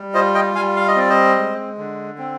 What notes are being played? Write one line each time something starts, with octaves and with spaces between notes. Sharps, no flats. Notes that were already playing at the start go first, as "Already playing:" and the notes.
Already playing: G3
F4 C5 D#5
D#5 G5
G3 F5 G#5
F5
D#5
C4 D5
C5 D#5
G#3
D3
C4